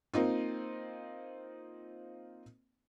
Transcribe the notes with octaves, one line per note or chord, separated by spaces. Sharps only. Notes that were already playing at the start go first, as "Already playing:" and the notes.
A#3 C4 D#4 F4